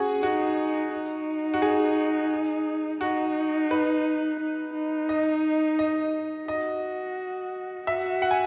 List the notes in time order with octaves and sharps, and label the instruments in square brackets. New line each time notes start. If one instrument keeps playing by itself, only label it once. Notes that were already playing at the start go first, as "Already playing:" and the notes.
Already playing: [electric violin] C#4 [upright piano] F#4 G#4
[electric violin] D#4 [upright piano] F#4
[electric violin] D#4
[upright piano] F#4
G#4
[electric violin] D#4 [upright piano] F#4
[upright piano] B4
[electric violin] D#4
D#4
[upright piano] D#5
D#5
[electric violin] F#4 [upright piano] D#5
[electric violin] F#4 [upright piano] E5
[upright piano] F#5
G#5